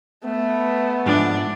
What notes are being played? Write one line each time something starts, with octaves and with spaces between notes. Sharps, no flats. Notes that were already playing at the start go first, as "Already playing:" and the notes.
A3 B3
G#2 F3 D4